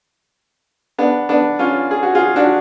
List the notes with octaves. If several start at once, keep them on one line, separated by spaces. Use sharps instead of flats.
B3 D4
B3 D4
C#4 F4
G#4
F#4
F4 G#4
D4 F#4